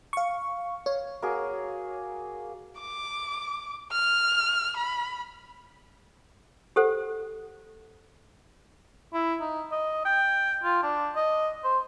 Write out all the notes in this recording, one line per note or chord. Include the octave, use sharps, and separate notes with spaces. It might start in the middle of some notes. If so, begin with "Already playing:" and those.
F5 C#6
C#5 F5
A#3 F#4 G#4
D6
F6
B5
G4 A4 C5 F#5
E4
D#4
D#5
G5
F4
D4
D#5
C5